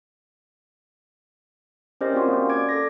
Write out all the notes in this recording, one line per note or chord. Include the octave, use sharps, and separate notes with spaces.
C#4 G4 A#4 C5 D5 D#5
C4 F4 F#4 A#4
A#3 C#4
D5 D6 G#6 D7
A4 D6 A#6